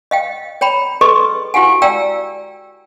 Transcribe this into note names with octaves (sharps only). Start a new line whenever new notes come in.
D#5 F5 G5
C#5 G5 A#5 B5
G#4 A4 B4 D#5 C6 C#6
E4 F#4 G4 F5 F#5 G#5
D5 F5 G5 A#5 E6